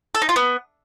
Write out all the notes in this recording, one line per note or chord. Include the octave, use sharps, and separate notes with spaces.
A4
D#4
F4
B3